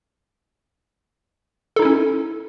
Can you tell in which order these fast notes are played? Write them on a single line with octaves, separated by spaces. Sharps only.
A4 D#4 E4 C#4